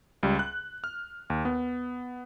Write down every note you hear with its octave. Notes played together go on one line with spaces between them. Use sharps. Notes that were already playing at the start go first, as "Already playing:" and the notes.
C#2 G3
F#6
F6
D#2
B3